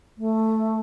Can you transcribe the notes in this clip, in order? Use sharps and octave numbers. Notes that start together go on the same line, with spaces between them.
A3